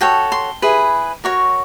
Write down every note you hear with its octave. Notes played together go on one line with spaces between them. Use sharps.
F#4 A4 C#5 G5
C6
E4 G#4 B4
F#4 A#4 C#5 C#6